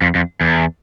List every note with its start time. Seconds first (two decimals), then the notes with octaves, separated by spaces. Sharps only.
0.02 F2
0.15 F2
0.41 E2